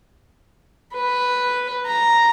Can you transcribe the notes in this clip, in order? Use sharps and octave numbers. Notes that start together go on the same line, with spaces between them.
B4
A#5